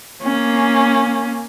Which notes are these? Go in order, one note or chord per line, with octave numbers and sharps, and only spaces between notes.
A#3 C#4